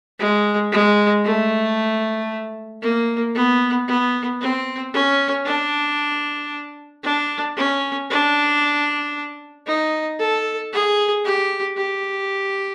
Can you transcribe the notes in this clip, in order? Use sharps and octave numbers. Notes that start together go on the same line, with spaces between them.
G#3
G#3
A3
A#3
B3
B3
C4
C#4
D4
D4
C#4
D4
D#4
A4
G#4
G4
G4